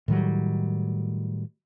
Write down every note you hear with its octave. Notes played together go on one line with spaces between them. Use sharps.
A2 D#3 F#3 G3